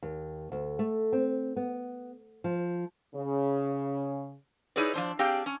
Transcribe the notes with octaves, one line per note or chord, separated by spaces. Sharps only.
D#2
D2
A3
C4
B3
F3
C#3
D#4 E4 G#4 B4 C#5 D5
F3 D4 C5
C4 D4 G4 G#4 F5 G5
C#4